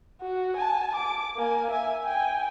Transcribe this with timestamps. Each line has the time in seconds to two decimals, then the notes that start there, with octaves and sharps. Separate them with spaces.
0.20 F#4
0.57 G#5 A5
0.95 D6
1.37 A#3 G#5
1.71 E5 G#5
2.04 G5 G#5